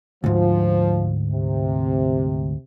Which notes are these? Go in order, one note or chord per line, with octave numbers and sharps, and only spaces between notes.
D2 G#2 F3
C3